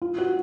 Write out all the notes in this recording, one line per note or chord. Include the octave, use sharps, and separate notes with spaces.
F4
F#4